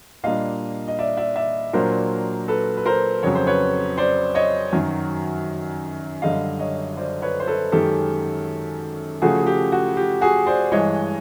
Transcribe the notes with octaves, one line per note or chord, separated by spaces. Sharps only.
A#2 G3 A#3 D4 D#5 F5
D#5
D5 E5
D5 E5
D5 E5
A#2 F#3 A#3 D4 A#4 C5
A4 B4
B4
A#4 C5
F2 C#3 F#3 C#5
C5
B4 C#5
C5 D5
C#5 D#5
F#2 D#3 F#3
F#2 D3 G3 D#5 F5
C#5 D#5
C5 D5
B4 C#5
C5
A4 B4
F#2 D#3 G#3 C#4 G4 A4
C#3 F3 A3 F#4 G#4
G#4
G4
F#4
G4
F#4 G#4
C5 D5
G2 E3 G#3 C#5 D#5